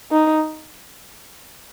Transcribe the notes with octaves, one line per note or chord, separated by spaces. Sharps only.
D#4